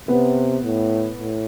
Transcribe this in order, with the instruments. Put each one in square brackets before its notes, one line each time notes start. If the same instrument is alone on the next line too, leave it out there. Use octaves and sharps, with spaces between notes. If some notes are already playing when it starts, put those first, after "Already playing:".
[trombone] C3 [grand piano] B3 B4
[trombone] A2
A2